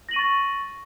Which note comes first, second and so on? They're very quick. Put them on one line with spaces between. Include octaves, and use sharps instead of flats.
A#6 F#7 D#7 C#6 A6